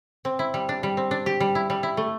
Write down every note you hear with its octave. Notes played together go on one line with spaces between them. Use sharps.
C4
E4
G3
D4
G3
C4
D4
G4
G3
E4
G3
E4
A3